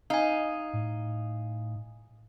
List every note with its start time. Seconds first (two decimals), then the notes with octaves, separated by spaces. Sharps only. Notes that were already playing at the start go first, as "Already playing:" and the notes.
0.10 D#4 F5 G#5
0.73 A2